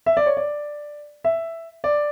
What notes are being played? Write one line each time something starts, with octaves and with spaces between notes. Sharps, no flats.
E5
D5
C#5
D5
E5
D5